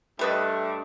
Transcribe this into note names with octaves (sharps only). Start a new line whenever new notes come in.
G2 G3 A3 B4 D#5